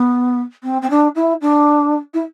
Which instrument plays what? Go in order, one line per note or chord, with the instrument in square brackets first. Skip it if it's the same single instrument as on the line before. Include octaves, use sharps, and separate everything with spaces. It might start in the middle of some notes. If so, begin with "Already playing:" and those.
Already playing: [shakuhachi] B3
C4
C4
D4
E4
D4
E4